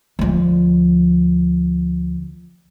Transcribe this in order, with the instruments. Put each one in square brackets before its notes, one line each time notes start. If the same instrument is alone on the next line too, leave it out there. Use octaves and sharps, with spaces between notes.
[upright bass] D2 F3